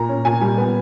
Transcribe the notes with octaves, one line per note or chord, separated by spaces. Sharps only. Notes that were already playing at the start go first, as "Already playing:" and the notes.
Already playing: A#2 A#5
C#4
A#2 G#5
G3 G#5
B3